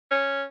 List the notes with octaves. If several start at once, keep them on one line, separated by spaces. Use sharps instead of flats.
C#4